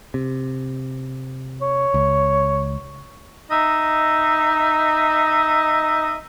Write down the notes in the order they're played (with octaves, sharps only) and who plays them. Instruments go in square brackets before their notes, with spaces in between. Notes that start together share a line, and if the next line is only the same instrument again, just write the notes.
[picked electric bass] C3
[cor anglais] C#5
[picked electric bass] C#2
[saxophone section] D#4 D#5 E5